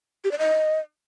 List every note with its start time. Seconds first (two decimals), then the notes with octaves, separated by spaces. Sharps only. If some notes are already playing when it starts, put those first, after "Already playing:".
0.24 G4
0.31 D5
0.39 D#5